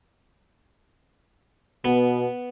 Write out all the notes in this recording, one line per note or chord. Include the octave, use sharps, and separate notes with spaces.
B2 B3